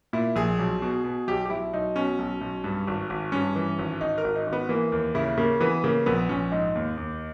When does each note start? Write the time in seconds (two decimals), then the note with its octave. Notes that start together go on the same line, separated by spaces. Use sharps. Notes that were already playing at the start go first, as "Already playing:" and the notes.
0.13 A#2 E4
0.36 A#1 G#4
0.59 B1
0.82 B2
1.04 B2
1.28 B1 G4
1.46 G4
1.50 B1 E4
1.74 B1 D#4
1.96 B2 C#4
2.19 B1
2.41 B1
2.64 G2
2.87 G#1
3.10 G#1
3.32 G2 C#4
3.56 E3
3.79 G#1
4.00 G#1 D#4
4.18 A#4
4.24 G#1
4.35 D#4
4.47 G#1
4.53 B3
4.69 E3 A#3
4.92 D#2 A#3
5.15 C#3 E4
5.37 C#3 A#3
5.60 E3 B3
5.84 C#3 A#3
6.06 A#1 B3
6.29 A#1 C#4
6.51 G#2 D#4
6.75 D#2
6.97 D#2